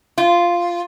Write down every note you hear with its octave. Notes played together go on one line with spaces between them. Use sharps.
F4